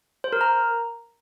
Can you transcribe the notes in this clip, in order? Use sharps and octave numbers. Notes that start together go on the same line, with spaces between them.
C5
A#4
A#5